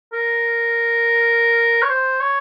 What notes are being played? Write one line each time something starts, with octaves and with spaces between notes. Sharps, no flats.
A#4
C#5
C5
C#5